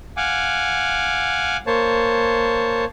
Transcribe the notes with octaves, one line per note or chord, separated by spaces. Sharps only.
F5 F#5 G#5 D6
A#3 C5 C#5 A5